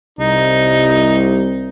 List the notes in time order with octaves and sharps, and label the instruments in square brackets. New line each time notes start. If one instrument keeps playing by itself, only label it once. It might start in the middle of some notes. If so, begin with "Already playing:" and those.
[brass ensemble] C2 [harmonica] D#4